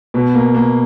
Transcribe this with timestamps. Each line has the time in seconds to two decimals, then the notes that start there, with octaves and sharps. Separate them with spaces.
0.14 B2
0.34 A#3
0.55 A#3